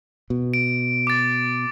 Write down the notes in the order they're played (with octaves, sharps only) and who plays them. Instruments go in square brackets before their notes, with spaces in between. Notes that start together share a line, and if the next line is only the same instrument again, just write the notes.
[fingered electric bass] B2
[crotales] D7
D6 A6